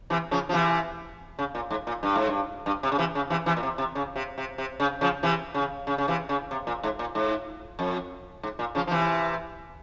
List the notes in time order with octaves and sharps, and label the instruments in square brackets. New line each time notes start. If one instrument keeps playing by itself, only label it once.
[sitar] C3 E3
C#3 F3
F3
C3 E3
C#3
A#2
G#2
A#2
G2
G#2
G2
G2
C3
C#3
C3 E3
C#3
C3 E3
C3 E3
A#2
C3
C3
C#3
C3
C3
C3
C#3
C#3 F3
C3 E3
C#3
C#3
C#3
C3 E3
C#3
C3
A#2
G#2
A#2
G#2
F2
G#2
A#2
C#3 F3
F3
C3 E3